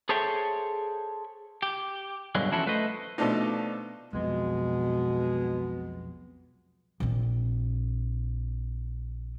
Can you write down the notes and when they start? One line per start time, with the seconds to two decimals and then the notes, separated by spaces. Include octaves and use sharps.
0.09 G#4 A4 C5 C#5 E5 G5
1.63 G4
2.35 G2 B2 D3 F#3 G#3
2.51 E3 F3 C#4 E4 F#4 A4
2.66 A3 B4 C5 D#5
3.18 B2 F3 A3 D4 D#4
4.13 B1 F2 B2 G#3 B3
7.00 A#1 C4